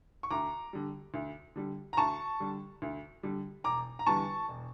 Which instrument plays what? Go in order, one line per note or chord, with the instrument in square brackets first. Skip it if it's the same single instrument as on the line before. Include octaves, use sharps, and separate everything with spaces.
[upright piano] C#6
D2 A#5 D6
D3 G3
D2
D3 G3
A#5
D2 A5 C#6
D3 G3
D2
D3 G3
E1 A#5 D6
A#5
E2 D3 G3 A5 C#6
E1